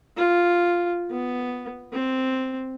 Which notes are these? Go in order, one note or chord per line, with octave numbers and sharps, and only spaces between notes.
F4
B3
C4